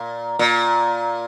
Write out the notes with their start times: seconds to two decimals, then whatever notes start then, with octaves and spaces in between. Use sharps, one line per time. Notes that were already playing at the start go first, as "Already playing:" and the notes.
Already playing: A#2
0.39 A#2